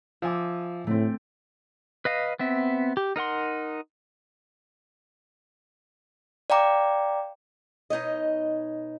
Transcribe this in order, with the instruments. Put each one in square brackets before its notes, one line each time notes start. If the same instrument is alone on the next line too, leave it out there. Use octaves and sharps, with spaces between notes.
[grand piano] F3 [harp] E5 G#5 D6
[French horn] A2 [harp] A3 C4
[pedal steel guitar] B4 D#5 F5
B3 C4 E5
G4
D#4 A#4 F#5 C6
[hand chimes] D5 F5 G5 A#5 D6
[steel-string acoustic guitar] B2 D#4 C#5 D#5